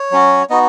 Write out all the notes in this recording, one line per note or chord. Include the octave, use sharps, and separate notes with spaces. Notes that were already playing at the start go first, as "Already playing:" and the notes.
Already playing: C#5
F#3 C#4 F#4
B3 D#4 F#4 D#5